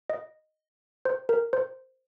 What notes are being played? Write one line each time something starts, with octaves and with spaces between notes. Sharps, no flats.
D#5
C5
A#4
C5